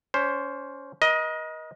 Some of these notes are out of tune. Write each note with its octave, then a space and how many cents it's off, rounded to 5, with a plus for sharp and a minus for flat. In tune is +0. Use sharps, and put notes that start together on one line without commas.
C#4 +25 C5 +5
A#4 +45 D#5 +15